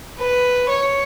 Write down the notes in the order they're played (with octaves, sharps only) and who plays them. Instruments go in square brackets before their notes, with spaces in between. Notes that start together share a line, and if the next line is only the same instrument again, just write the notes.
[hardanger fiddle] B4
C#5